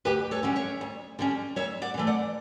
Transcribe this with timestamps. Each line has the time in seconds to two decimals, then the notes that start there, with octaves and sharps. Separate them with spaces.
0.05 D2 G4 B4
0.31 A4 C#5
0.43 D3 G3 C#4
0.56 C#5 E5
0.81 D2
1.19 D3 G3 C#4
1.56 D2 C#5 E5
1.82 D5 F#5
1.94 C#3
1.97 E3 A3
2.07 D5 F#5